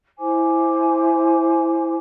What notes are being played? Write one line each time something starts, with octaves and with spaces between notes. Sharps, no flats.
E4 C5 G#5 D6